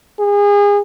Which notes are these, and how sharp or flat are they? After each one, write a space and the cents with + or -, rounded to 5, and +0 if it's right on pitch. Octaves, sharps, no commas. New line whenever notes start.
G#4 -30